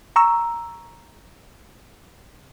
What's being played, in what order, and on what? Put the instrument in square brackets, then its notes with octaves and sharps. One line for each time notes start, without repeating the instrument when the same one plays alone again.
[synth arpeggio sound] A#5 C#6 E6